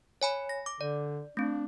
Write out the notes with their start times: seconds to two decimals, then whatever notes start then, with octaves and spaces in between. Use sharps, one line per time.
0.22 C#5 G#5 B5
0.49 A#6
0.66 D6
0.81 D3 D5
1.37 A3 C4 D4